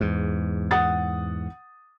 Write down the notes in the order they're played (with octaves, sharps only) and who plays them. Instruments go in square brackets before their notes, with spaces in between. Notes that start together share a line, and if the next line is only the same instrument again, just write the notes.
[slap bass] E2 G#2
[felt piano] F#5 D#6 A6